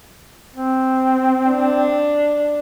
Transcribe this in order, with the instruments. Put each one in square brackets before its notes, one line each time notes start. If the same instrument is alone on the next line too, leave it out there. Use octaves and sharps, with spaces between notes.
[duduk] C4
[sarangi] D4